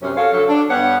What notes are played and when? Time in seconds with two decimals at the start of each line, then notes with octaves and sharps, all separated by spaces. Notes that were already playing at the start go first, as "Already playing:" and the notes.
0.02 F#2 C3 C#4
0.16 F#3 A4 C#5 F5
0.33 D3 F#3 A4
0.48 D4
0.69 G2 B3 D4 B4 C#5 F#5